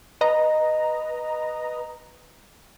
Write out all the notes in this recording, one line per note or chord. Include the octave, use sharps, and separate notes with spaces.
B4 D#5 A#5